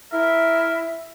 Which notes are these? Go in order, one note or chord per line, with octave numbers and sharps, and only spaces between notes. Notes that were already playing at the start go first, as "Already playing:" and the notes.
E4 A#4 E5